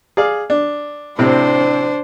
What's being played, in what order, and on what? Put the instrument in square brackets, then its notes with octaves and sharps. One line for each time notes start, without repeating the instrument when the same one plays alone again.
[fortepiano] G#4 D5 F5
D4
[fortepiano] A2 C3 C4 [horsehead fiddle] D4 C5